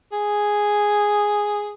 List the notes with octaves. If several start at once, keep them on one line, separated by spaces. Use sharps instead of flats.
G#4